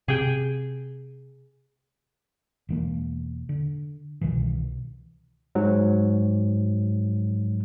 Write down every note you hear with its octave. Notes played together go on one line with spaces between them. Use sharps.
C3 G#4 G5
E1 E3 A#3
D3
C2 B2 D#3 E3
G#2 F#3